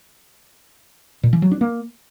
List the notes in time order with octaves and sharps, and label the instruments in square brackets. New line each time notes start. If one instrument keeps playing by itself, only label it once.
[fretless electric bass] A#2
E3
F#3
D4
A#3